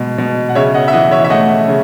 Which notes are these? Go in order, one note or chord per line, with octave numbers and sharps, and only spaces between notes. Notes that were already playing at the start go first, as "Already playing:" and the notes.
Already playing: B2 G#3
B2
F#5
C#3 C#5 E5
D#5 F#5
E5
E3 D#5 F#5
C#5 E5
E5
A3 D#5 F#5
C#3